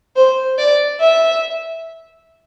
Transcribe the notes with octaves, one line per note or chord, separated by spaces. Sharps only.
C5
D5
E5